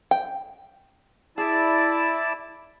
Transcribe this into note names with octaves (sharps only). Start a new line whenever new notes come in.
G5
E4 G#4 D5 A5